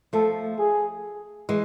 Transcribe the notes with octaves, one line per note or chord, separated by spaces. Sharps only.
F3 A3 A4
G#4
E3 G#3